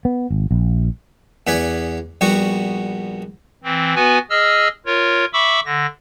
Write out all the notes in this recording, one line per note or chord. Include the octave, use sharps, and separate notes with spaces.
B3
G#1
A#1
E2 B3 B4 D5 G#5
A#1 G3 B3 F#4 C#6
E3 C4
B3 F#4 B4 G#5
G#4 D#5 E6 F6
F4 A#4 C#5
E5 B5 C#6 D6 E6
D3 A#6